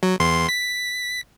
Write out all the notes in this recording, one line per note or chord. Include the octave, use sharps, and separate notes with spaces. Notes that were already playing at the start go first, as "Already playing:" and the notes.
F#3
E2 C6
B6